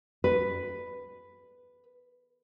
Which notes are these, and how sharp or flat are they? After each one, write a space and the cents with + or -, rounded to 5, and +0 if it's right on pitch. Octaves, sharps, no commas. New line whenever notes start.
B4 +5